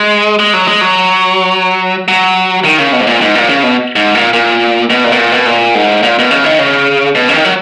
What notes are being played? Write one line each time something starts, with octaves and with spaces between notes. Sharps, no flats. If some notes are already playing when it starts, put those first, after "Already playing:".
Already playing: G#3
G#3
F#3
G#3
F#3
F#3
D#3
C#3
B2
G#2
A#2
G#2
A#2
C#3
B2
G#2
A#2
A#2
B2
A#2
B2
A#2
B2
A#2
G#2
A#2
B2
C#3
D#3
C#3
B2
C#3
D#3
F#3